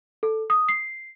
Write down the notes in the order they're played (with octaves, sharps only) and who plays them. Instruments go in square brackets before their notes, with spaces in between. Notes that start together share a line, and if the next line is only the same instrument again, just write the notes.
[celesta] A4
D#6
C7